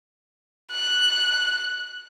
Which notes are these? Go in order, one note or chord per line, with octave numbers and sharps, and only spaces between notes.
F#6